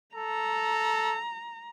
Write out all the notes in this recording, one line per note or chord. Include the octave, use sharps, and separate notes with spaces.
A4 A#5